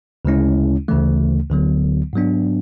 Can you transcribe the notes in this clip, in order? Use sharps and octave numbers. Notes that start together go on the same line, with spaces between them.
D2 C#3 G#3 C#4 E4
D2 C#3 E3 A3
D2 D3 F#3 B3
G#2 F#3 B3 D4